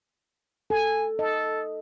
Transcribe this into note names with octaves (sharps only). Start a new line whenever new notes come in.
A4 G#5
A4 D#5